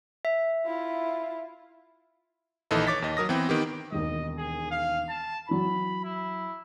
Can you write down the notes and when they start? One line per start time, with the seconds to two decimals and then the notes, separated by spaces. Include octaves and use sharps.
0.25 E5
0.66 E4 F4
2.71 A#1 D#3 E3 A4 D#5
2.87 C#5 D6 A6 B6
3.02 D#2 D#5
3.17 F#3 A#4 D#6 A#6
3.29 E3 B3 C4 G5
3.49 D#3 B3 G4
3.92 E1 D#2 D#5
4.38 G#4
4.71 F5
5.09 A5
5.49 E3 F#3 B5
6.04 E4